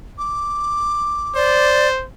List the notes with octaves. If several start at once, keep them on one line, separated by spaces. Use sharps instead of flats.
D6
C5 D5